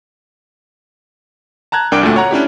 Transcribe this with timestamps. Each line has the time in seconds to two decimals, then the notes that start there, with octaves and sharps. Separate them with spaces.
1.72 A5 A#5 F#6 G#6
1.92 C2 D4 A#4 G5 D6 D7
2.03 D2 A#2 A3
2.16 C#5 F#5 A#5
2.31 C#4 D4 E4 G4